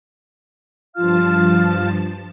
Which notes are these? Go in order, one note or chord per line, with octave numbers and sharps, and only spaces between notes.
G2 F3 F4 F5 A5 F6